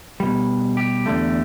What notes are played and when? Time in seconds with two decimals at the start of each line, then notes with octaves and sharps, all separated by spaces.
0.20 B2 G3
0.77 G4
1.06 E2 D3 A3